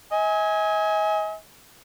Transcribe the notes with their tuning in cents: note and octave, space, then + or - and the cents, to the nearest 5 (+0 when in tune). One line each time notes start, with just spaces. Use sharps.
D#5 +45 G#5 +0